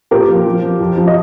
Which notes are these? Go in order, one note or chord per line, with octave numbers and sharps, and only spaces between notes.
A#2 G4 A#4
F3
F3
F3
F2
F3
D#5